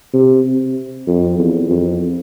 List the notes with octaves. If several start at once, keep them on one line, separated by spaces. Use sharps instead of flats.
C3
F2
E2
F2